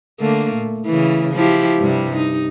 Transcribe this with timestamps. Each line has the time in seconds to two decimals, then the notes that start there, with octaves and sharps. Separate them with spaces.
0.20 D3 A3 A#3
0.55 A#2
0.86 C#3 E3
1.34 F3 E4 G4
1.79 G2 C3 G3
2.16 D#4